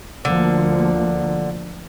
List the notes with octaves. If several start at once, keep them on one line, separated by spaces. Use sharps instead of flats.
D2 D3 F3 A#3